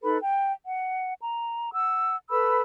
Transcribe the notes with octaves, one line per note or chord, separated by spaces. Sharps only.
D#4 A4 B4 B5
G5
F#5
A#5
F#5 E6
A4 B4 B5 E6